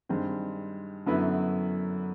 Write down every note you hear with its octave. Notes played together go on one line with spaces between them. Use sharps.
G2 D#3 G#3 C4
F#2 D3 F#3 B3 E4